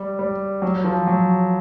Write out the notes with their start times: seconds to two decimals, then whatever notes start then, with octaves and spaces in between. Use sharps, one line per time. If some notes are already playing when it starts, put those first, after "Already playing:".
Already playing: G3
0.19 G3
0.62 F#3
0.84 F3
1.07 F#3